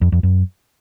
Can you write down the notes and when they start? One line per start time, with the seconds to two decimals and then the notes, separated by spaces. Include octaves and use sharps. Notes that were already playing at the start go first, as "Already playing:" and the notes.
0.01 F2
0.12 F2
0.23 F#2